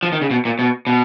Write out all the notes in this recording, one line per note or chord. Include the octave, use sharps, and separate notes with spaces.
F3
D#3
C#3
B2
A#2
B2
B2